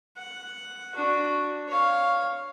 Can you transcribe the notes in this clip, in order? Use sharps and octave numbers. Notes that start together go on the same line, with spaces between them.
F#5
D4 F#4
C#5 F5